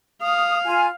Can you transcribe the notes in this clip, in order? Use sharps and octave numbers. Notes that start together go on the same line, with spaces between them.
F5 D#6
F4 G#5